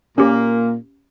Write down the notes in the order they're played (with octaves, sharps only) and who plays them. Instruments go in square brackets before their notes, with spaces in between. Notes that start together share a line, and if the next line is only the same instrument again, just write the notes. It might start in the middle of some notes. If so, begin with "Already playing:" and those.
[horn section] A#2 A#3 [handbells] C#4 G4